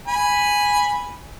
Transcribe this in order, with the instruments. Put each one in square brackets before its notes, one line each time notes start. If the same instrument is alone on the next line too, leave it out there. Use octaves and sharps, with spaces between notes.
[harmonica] G#5 B5